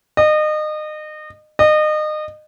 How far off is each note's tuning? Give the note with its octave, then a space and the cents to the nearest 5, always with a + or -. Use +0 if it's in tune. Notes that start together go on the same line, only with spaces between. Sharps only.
D#5 -30
D#5 -30